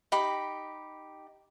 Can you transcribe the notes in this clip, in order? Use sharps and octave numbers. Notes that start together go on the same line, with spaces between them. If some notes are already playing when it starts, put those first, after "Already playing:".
D#4 G4 B5